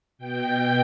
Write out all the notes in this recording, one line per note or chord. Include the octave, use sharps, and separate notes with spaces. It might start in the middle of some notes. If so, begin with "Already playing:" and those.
B2 G5